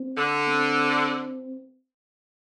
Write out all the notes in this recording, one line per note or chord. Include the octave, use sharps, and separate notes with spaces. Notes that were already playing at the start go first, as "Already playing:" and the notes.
Already playing: C4
D3
C4